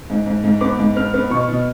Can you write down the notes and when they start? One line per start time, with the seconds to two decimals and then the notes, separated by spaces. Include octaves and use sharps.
0.10 G#2
0.26 G#2
0.44 G#2
0.61 B3 D6
0.79 G#2
0.96 B3 F6
1.14 B3
1.30 B2 C#6
1.48 B2